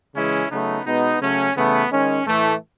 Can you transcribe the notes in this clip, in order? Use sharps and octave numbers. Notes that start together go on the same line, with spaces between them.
C#3 E3 G#3 C#4 E4
C#3 F#3 A3 B3 D#4
B2 G#3 B3 D#4
C#3 F#3 A3 C#4
C#3 E3 A3 B3
D#3 G#3 C#4
A2 E3 A3